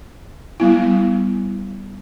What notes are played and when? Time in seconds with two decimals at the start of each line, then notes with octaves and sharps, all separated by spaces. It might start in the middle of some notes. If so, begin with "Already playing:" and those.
0.60 G3 B3 E4